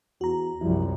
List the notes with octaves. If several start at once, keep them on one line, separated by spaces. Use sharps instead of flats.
E2 F#4 A#5
C2 F#2 F3 G3 E4